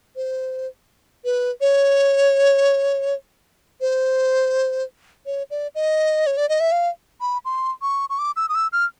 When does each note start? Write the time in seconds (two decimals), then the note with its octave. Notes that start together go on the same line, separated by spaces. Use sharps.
0.16 C5
1.25 B4
1.61 C#5
3.81 C5
5.26 C#5
5.50 D5
5.75 D#5
6.27 C#5
6.37 D5
6.49 D#5
6.60 E5
6.72 F5
7.21 B5
7.45 C6
7.82 C#6
8.10 C#6
8.19 D6
8.36 E6
8.49 D#6
8.55 E6
8.73 F6